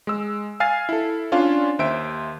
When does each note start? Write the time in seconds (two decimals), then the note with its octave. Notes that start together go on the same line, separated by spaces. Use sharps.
0.07 G#3 E6
0.60 F5 G#5 F6 A6 C7
0.89 E4 A4
1.32 C#4 D4 F4 D5 F5
1.79 D#2 C5 E5 D7